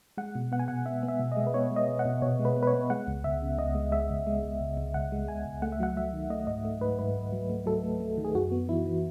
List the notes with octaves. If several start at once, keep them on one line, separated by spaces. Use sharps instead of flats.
G#3 F#5
B2
B3 F#5
G#5
B2 F#5
B3 E5
B3
E5
B2
G#3 D#5
B4
B3 C#5
G#3
D#5
B2
F#5
B2
B2 C#5
G#3
B4
B3
B4
C#5
B3
G#3 F#5
C#2
C#2 E5
C#3
C#2 D#5
G#3
G#3 E5
C#2
G#3
C#2
C#2
C#2
C#2 F#5
G#3
C#2 G#5
C#2
A3 F#5
E5
F#3 F#5
F#3 E5
D#3
A3 D#5
G#2 D#5
A3
G#2 B4
G#2 B4
G#2
F#3
A3
F#3 A4
A3
A3
D#3
G#4
F#2 F#4
B3
E3 E4
E3